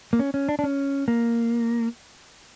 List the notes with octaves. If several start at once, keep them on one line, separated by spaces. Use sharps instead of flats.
A#3
C#4
C#4
D4
D4
C#4
A#3